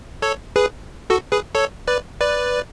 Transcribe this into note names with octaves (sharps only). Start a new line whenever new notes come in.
A4 C#5
G#4 B4
F#4 A4
G#4 B4
A4 C#5
B4 D5
B4 D5